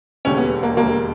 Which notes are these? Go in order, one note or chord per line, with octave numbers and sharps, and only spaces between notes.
E1 D#2 D3 G3 C#4
B3
A#3
E1 D#2 D3 G3 A#3